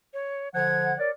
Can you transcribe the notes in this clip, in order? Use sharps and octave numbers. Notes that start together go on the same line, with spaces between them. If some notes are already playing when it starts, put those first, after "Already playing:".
C#5
D3 F3 F#5 G#6
A#4 C#5 D5